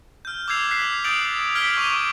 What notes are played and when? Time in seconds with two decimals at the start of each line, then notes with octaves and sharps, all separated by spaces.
0.25 F6 G6
0.48 D6 E6 G6 G#6 C7 F7
0.71 F#6 B6 C7
1.04 D#6 G6 A6 D7 F7 F#7
1.55 F6 G#6 B6 D7 G7
1.77 C#6 D6 D#7 F7